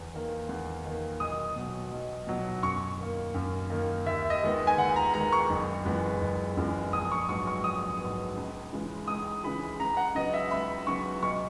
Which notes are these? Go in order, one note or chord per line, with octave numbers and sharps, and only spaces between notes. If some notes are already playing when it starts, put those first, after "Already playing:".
Already playing: E2
D#3 A#3
E2
D#3 A#3
B1 D#6
B2 F#3
B1
B2 F#3
F#2 C#6
D#3 A#3
F#2
D#3 A#3
D#2 E5
D#5
D#3 G#3 B3
G#5
D#2 F#5
A#5
D#3 G#3 B3 A#5
C#6
F#1
F#2 E3 G#3 B3
F#1
F#2 E3 G#3 B3
A#1 D#6
C#6
G#2 F#3 B3 C#6
C#6
A#1 D#6
G#2 F#3 B3
C#2
C#3 E3 G#3
C#2 D#6
C#3 E3 G#3 B5
C#2 A#5
F#5
C#3 F#3 B3 D#5
E5
C#2 B5
C#3 F#3 B3 C#6
B1 C#6